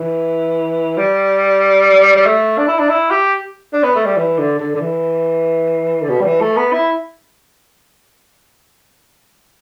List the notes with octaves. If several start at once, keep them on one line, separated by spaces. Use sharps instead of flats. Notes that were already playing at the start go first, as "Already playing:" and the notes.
Already playing: E3
G3
G3
A3
D4
E4
D4
E4
G4
D4
B3
A3
G3
E3
D3
D3
D3
E3
D3
B2
G3
E3
A3
B3
E4